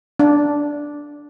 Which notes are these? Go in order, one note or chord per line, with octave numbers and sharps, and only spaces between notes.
D4